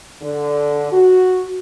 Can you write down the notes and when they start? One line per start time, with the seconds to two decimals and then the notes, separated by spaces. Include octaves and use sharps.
0.22 D3
0.92 F#4